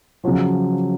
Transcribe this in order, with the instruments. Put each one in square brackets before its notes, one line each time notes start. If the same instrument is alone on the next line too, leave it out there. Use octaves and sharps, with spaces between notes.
[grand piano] C#3 F3 F#3